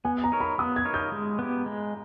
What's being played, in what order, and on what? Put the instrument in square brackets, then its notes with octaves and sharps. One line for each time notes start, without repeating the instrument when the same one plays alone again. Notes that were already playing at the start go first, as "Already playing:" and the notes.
[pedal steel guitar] B3 [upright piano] G#5
[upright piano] A#5
[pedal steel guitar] D#4 A#4 C#5
[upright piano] B5
[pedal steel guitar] B3 [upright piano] D#6
[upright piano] G#6
[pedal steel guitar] D#4 A#4 C#5
[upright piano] G6
[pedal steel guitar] G#3
B3 G4
G#3